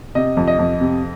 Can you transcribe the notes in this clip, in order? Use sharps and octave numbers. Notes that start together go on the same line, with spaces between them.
C3 D#5
F2
D#5
F2
C3